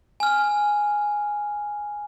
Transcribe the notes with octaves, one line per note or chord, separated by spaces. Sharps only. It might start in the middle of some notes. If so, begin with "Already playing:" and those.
G#5 F6